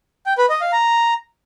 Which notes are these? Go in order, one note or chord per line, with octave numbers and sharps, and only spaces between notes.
G5
B4
D#5
F5
A#5